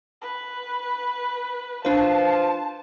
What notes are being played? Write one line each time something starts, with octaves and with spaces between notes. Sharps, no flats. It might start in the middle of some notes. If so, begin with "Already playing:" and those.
B4
F3 D4 B4 A5